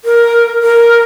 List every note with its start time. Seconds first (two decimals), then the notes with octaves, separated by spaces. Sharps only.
0.05 A#4
0.63 A#4